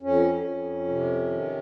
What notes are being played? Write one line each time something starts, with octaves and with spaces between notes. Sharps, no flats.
F2 C#4
F2
C3
D#3